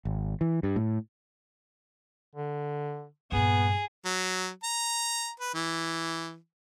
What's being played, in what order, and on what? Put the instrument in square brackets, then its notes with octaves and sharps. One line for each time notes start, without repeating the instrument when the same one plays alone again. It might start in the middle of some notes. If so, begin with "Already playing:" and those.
[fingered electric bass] G#1
E3
G2
A2
[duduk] D3
[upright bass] G2 A#2 [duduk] B3 [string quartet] G#4
[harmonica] F#3
A#5
B4
E3